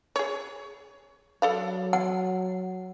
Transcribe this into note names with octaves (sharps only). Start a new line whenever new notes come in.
G#4 C#5
F#3 A4 D5 F5
F#5